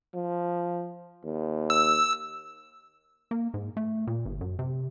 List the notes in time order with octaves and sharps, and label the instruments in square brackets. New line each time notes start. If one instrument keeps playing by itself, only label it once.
[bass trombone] F3
D#2
[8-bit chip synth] E6
[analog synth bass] A#3
G#2
A3
A#2
G1
F#2
C3